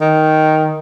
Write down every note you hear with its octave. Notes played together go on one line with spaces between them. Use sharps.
D#3